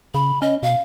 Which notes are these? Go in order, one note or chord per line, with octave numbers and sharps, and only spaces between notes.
C#3 B5
C#4 D#5
B2 F5